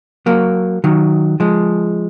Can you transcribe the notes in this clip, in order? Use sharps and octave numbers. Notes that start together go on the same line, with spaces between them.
F#3 A#3
D#3 F#3
F3 G#3